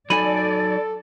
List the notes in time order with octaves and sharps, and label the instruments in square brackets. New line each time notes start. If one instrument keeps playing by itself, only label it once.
[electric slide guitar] F#3 D#4 G#5 [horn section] A4 [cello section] D5 [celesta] B5 D#7 F#7